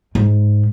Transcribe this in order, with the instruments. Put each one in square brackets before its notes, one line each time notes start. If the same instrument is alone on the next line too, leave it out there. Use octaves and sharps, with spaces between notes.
[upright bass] G#2